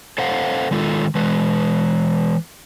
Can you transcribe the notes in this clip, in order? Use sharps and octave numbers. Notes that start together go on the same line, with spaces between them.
A4 C5 F5 F#5
D#3 G#3 F4 A4
E3 G#3 B4